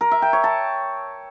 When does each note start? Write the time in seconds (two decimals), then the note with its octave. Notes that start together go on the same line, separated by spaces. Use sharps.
0.01 A#4
0.11 E5
0.22 G5
0.33 C#5
0.44 A5